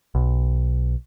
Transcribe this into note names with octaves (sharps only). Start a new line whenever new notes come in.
B1